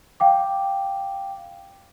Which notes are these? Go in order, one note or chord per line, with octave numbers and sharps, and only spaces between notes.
F5 G5 D6